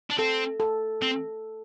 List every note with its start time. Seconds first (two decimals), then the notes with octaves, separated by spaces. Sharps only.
0.10 D4
0.18 C4 A4
0.60 A4
1.02 C4